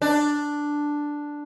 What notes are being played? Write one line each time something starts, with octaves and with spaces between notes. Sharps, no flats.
D4